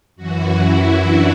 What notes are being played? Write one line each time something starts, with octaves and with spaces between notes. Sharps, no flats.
F#2 E3 F#4
E4
D4